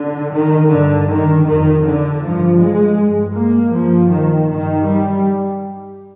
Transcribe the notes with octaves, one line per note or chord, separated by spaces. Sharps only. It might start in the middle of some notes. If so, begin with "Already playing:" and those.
Already playing: D3
D#3
G2 D3
D#3
F2 C3 D#3
D3
G2 F3
G#3
G2
A#3
G2 F3
D#3
G2 D#3
G3